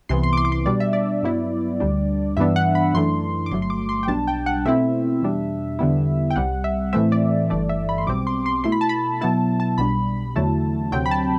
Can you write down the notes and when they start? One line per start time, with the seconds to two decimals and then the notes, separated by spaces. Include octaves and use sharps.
0.09 C2 C3 E3 B3 C6
0.23 C6
0.33 D6
0.37 C6
0.45 D6
0.52 C6
0.66 B2 G3 D4 D5
0.80 E5
0.93 D5
1.22 G2 F#3 B3 E4
1.80 D2 D3 G3 D4
2.37 G2 E3 B3 D4 E5
2.56 F#5
2.75 B5
2.93 F#2 E3 A3 D4 C6
3.46 D6
3.51 G1 G2 F#3 A3 C6
3.62 C6
3.70 D6
3.89 C6
4.03 G5
4.08 B1 B2 G3 D4 A5
4.27 G5
4.46 F#5
4.65 B2 A3 C4 E4 E5
5.22 E2 B2 G3 D4
5.79 E2 D3 G3 B3 E4
6.30 G5
6.36 C2 C3 G3 F#5
6.64 E5
6.93 A2 E3 A3 C4 E5
7.12 D5
7.50 G1 G2 E3 A3 D5
7.69 E5
7.89 B5
7.98 C6
8.07 B1 B2 G3 C4 D6
8.27 C6
8.46 C6
8.64 B2 A3 E4 C6
8.72 B5
8.81 A5
8.89 B5
9.21 B2 F#3 B3 E4 A5
9.60 A5
9.78 B1 B2 G3 D4 B5
10.36 E2 D3 F#3 A3 E4 A5
10.92 D2 C3 F#3 C4 G5
11.06 B5
11.11 A5